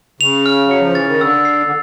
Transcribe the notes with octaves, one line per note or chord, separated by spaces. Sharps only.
C#3 F7
F6
F#3
C#7
F3
E3 A6
D#3
D3 E6
C7
D3